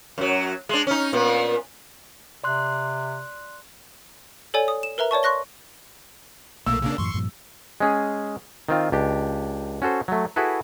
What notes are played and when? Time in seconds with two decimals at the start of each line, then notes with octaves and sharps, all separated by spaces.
0.18 F#2 F#3
0.69 G#3 D4
0.87 C#4 D#4
1.13 A#2 B3
2.44 C3 D5 C6 F#6
4.54 A4 C#5 D5 G#5
4.68 D#6
4.83 E7
4.98 A#4 B4 E5 A#5
5.11 C#5 D5 A5 C#6
5.23 C6 C#6 F#6 A#6 G7
6.66 B1 A#2 A3 A#3 E6
6.82 C#3 A#3 D4
6.98 F#2 A2 E3 C6 C#6
7.14 G2 A#2 F3
7.80 G#3 C#4 G#4
8.69 D#3 C4 F4
8.92 C#2 D4 G4
9.82 C#4 F#4 A4 C5
10.08 F#3 A3
10.36 E4 F#4 G#4 A4 B4